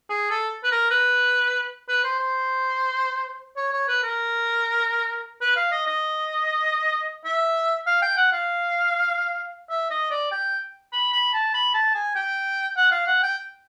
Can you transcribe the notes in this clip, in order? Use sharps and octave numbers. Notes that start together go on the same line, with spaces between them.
G#4
A4
B4
A#4
B4
B4
C5
C5
C#5
C#5
B4
A#4
B4
F5
D#5
D#5
E5
F5
G5
F#5
F5
E5
D#5
D5
G5
B5
B5
A5
B5
A5
G#5
G5
F#5
F5
F#5
G5